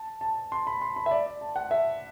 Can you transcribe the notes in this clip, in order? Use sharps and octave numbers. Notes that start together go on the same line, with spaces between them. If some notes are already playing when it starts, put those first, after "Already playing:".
Already playing: A5
A5
C6
B5
C6
B5
E5
D5
D5
A5
F#5
E5